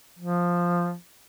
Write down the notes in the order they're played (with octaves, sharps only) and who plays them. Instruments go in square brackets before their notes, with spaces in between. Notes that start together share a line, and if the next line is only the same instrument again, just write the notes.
[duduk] F3